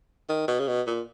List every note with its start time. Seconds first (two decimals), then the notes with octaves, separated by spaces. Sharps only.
0.29 D#3
0.48 B2
0.60 C#3
0.68 B2
0.87 A#2